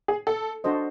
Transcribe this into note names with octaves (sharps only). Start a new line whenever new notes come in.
G#4
A4
D4 F#4 A4 C5 D#5